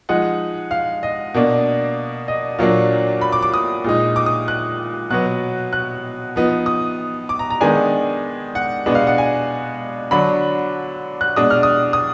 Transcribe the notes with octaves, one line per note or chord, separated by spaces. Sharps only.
F3 G#3 D#4 F#5
F5
D#5
B2 A#3 D4
D#5
A#2 F#3 A#3 D4 F5
B5
D6
D6
D#6
A#2 G#3 D#4
D6
D#6
F#6
B2 F#3 B3 F#6
F#6
F3 B3 D#4
D#6
D6
A#5
A#5
D#3 G#3 B3 D4 G#5
F#5
B2 G#3 B3 D4
F5
F#5
G#5
D3 F#3 D4 B5
F#6
B2 G#3 D4 D#6
F6
D#6
D#6